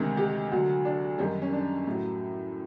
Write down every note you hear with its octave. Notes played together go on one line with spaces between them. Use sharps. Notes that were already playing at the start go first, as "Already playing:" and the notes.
Already playing: D2 C3 D#3 G#3
G4
D2 D3 F#3 F#4
D4
F#2 D#3 G3 C#4
C#4
D4
A2 F#3